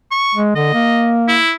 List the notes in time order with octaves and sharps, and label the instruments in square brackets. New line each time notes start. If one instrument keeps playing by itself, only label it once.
[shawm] C#6
[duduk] G#3
[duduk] D3 [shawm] D#5
[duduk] A#3
[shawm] E4